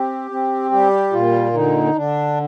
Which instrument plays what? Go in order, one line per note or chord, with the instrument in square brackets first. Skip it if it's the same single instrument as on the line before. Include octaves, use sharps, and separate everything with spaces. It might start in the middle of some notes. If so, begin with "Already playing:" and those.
Already playing: [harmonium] C4 G4
C4
G3 G4
A#2 F4
D3 D#4
D3 D4